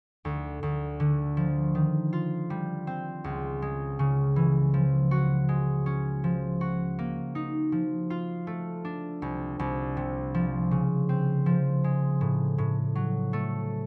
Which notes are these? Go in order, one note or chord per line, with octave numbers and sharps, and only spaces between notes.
D2
D2
D3
F3
D#3
F4
G3
C4
C#2
G#3
C#3
E3
F3
F#4
G#3
C#4
F3
F#4
A#3
D#4
F3
F4
A3
D4
C2
C2
C3
F3
C#3
C4
F3
G#3
A2
A2
F#3
A3